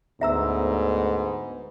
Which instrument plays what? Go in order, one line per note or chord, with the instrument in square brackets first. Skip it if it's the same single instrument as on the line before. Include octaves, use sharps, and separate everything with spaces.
[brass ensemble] D2 [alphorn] G#2 [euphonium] B3 [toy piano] E5 A#5 E6